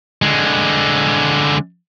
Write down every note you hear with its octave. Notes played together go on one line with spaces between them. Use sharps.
D3 G#3